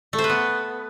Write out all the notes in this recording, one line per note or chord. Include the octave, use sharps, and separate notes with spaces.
A3
C5
B4
B3